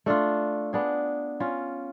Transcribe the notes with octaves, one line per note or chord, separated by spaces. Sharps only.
A3 D4 F4
B3 D4 G#4
C#4 F4